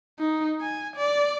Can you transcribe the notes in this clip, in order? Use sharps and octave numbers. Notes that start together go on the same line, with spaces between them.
D#4
G#5
D5